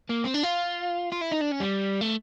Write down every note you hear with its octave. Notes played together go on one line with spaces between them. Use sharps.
A#3
C4
D4
F4
F4
E4
D#4
D4
C#4
G3
A3